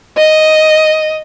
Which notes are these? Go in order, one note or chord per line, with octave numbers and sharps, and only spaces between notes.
D#5